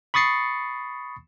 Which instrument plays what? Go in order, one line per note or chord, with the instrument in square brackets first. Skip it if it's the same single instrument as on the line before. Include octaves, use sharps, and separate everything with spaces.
[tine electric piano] B5 C#6 D#6 A6 C7 C#7